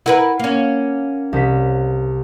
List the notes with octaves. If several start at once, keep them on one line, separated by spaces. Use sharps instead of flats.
E4 A#4 B4 F#5
A#3 C#4
C2 B6